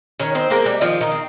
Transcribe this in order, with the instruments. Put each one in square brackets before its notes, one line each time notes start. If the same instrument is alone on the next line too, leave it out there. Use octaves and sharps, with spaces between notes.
[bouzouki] D#3 C#4 C#5
C4 C5
G#3 A#3 C4 A#4
G3 G4
D#3 F3 F4
D#3 D#4
C4